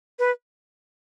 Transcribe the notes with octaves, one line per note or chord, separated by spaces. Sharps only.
B4